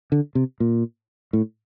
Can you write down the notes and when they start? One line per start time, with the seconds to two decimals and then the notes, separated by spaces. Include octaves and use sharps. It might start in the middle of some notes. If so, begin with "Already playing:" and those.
0.12 D3
0.35 C3
0.60 A#2
1.33 A2